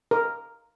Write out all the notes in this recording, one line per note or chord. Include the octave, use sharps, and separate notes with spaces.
A#4